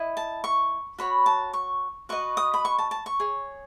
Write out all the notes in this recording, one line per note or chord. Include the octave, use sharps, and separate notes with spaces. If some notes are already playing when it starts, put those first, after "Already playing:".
Already playing: E4 D#5
A5
C#6
F#4 C#5 B5
A5
C#6
F#4 B4 D#5 C#6
D#6
B5
C#6
A5
A5
C#6
G#4 C#5